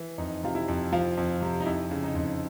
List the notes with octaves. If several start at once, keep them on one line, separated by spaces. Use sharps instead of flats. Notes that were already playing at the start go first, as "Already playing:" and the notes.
Already playing: E3
F2 D#4
C3 F4
E4
F2
F3 F4
F2
C3
D#4
F2 E4
C#3
D#4
F2